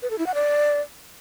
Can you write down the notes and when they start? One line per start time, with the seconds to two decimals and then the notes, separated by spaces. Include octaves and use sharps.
0.02 B4
0.10 A4
0.18 E4
0.26 F#5
0.35 D5